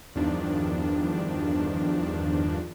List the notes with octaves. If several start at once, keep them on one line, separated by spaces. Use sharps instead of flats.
E2 G2 D#3 F3 D4